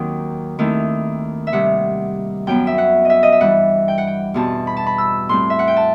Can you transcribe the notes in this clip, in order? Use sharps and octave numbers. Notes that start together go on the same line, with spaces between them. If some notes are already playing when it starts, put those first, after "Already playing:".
Already playing: D#2 D#3 F#3 C4 D#4 G5
D#2 D#3 A3 C4 E4
E5
C3 D#3 G3 F#5
F#2 F#3 B3 G5
E5
F#5
D#5 E5
D#5
E5
G2 E3 G3 F#5
G5
F#5
G5
E2 B2 G3 C4 A5
B5
A5
B5
E6
A2 G3 C4 C6
E5
F#5
G5
A5